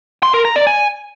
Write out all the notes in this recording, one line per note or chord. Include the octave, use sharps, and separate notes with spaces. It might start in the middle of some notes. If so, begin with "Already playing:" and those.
C6
A#4
A#5
D5
G#5